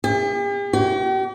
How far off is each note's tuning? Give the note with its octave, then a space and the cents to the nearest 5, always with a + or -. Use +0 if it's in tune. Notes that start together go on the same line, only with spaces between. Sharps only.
G4 +45
G4 -45